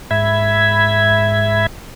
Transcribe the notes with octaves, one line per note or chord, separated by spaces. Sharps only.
G#2 E5 B5 G#6